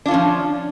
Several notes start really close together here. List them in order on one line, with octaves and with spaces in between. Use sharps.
D4 F4 C#4 F3